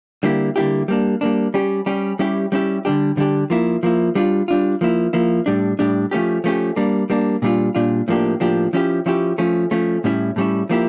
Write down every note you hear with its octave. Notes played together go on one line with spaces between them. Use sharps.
D3 G3 A#3 E4 G4
D3 G3 A#3 E4 G4
G3 A#3 D4
G3 A#3 D4
G3 C#4 G4
G3 C#4 G4
G3 C#4 E4 G4
G3 C#4 E4 G4
D3 G3 D4 G4
D3 G3 D4 G4
F3 A#3 E4
F3 A#3 E4
G3 D4 F4
G3 D4 F4
F3 A#3 E4
F3 A#3 E4
A2 G3 D4
A2 G3 D4
F3 A3 C#4 G4
F3 A3 C#4 G4
G3 A#3 D4
G3 A#3 D4
A#2 G3 D4 F4
A#2 G3 D4 F4
A2 F3 A#3 D4 G4
A2 F3 A#3 D4 G4
F3 C#4 E4 G4
F3 C#4 E4 G4
F3 A3 C#4
F3 A3 C#4
A2 G3 C#4 E4
A2 G3 C#4 E4
F3 A#3 E4 G4